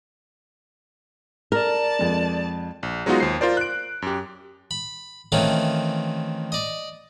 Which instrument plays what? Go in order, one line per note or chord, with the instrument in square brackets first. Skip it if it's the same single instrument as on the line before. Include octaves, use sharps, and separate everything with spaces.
[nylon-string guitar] A#4 [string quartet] D5 A5
[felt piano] F2 G#3
[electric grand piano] A#1
F#3 G#3 B3 D#4 F4 F#4
D#2 C5 C7
F4 A#4 C5 D5
F#6 D7
F#2 G4
[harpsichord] B5
D#3 E3 A3 C4 C#4 F4
D5 D#5